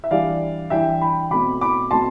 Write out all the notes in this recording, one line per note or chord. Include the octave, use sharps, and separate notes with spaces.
E5
E3 G3 D4 D5 F5
E3 G3 D4 E5 G5
G5 B5
B2 A3 C4 B5 D6
B5 D6
B2 A3 C4 A5 C6